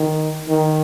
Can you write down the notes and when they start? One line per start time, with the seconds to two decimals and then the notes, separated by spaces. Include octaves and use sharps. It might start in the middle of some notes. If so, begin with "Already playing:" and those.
Already playing: D#3
0.48 D#3